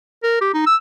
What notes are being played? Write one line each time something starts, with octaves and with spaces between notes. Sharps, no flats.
A#4
G4
D#4
E6